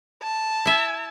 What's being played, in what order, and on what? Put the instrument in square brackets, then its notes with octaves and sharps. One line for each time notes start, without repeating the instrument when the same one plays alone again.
[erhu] A5
[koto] E4 E5